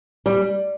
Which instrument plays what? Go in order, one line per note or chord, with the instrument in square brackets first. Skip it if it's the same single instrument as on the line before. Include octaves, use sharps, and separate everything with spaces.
[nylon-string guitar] G3